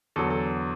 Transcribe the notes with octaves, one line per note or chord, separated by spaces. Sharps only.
E2 D3 F#3 A4
A4